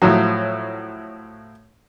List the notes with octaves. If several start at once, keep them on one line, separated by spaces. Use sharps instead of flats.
A2 F3 F#3